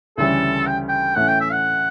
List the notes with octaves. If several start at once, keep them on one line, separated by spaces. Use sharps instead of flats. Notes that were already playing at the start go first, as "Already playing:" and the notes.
D2 C#3 E3 G3 C#4 A4
G5
G5
A2 E3 A3 C#4 F#5
G5
E5
F#5